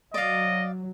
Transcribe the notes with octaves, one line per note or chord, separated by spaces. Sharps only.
F#3 D5 D#5 F5